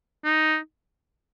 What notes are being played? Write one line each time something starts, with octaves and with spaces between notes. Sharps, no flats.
D#4